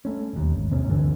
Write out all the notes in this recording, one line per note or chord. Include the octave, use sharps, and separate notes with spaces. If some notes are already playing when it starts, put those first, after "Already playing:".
A3 C#4
E1 D#2
G#1
D#1 C3 C4 C#4
D2 G2 D3 E3